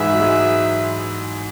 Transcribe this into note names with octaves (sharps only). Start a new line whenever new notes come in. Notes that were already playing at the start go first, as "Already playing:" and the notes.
Already playing: G#2 E3 G#3 D#4 G#4 B4 E5
F#3
G#3
F#3